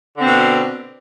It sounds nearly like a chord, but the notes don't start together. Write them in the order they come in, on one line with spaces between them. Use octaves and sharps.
D3 C4 B2